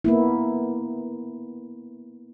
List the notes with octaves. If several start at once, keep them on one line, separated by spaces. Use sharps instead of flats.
A#3 B3 E4